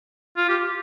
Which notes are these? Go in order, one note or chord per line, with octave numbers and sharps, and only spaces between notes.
F4
G4